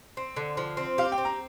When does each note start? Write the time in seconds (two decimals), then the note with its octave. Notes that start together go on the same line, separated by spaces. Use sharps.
0.17 C4
0.36 D3
0.57 F3
0.77 C4
0.98 G4 F5
1.12 G5
1.18 C4
1.25 A#5